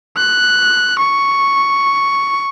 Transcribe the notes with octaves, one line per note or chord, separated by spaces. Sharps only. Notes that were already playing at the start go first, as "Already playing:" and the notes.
F#6
C#6